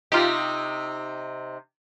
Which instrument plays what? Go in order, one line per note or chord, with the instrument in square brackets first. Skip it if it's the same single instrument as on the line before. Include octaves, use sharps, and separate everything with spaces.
[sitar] C3 D#4 [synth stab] F4 G4